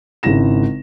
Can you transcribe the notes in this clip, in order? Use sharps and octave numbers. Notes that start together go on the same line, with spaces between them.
G#1 C#3 G#3 E4 A#6 E7